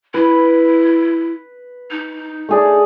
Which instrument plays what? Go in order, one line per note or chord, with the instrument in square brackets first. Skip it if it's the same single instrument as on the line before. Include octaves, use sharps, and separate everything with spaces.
[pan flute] E4 [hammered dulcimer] B4
[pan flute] D#4
[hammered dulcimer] A3 G#4 D5